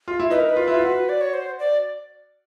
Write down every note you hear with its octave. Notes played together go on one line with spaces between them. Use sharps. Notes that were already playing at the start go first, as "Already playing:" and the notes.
F4
E4
D#4 B4
A#4
B4
F4
E4
F4
F#4
D5
C#5
C5
D5